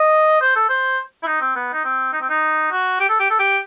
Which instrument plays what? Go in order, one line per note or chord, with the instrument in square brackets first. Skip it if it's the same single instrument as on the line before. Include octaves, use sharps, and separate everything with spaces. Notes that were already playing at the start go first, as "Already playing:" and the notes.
Already playing: [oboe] D#5
C5
A4
C5
E4
D#4
C4
B3
D#4
C4
D#4
C4
D#4
F#4
G4
A4
G4
A4
G4